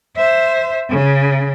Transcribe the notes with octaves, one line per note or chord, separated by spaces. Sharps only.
C5 E5
C#3